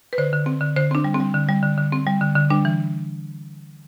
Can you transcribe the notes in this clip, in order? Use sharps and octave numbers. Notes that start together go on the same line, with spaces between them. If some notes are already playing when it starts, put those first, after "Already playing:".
B4
D3 C5
D3
C4
D3
D3 C5
C4 D4
G3
C4
G3
D3
G3
D3
D3
C4
G3
D3
D3
G3 D4
E3